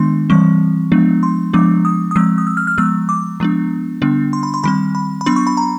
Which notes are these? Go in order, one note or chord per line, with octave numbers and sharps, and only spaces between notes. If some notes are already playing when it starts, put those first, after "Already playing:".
Already playing: D#3 G#3 B3 D4 C6
E3 G3 C4 C#6
F3 G#3 B3 D4
C6
F3 G#3 B3 D4 D6
D#6
D#6
F3 G#3 C4 E6
D#6
E6
F6
F6
F3 G#3 B3 E6
D6
F3 G#3 B3 D4
D3 G3 B3 D4
C6
B5
C6
D#3 G3 C4 B5
B5
B5
F#3 B3 D4 C6
C#6
B5
A#5